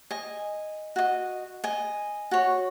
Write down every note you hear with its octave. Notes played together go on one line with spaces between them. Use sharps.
D#5 G#5
F#4 D#5
D#5 G#5
F#4 C#5